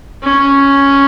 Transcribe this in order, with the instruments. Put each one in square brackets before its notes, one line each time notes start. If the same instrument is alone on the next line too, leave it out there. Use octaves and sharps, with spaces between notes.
[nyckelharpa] C#4